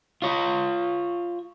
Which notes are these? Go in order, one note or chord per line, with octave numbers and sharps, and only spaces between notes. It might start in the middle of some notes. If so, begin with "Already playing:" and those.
F4 C#5